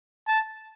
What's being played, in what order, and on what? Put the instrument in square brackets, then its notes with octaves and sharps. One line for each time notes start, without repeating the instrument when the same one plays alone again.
[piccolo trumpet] A5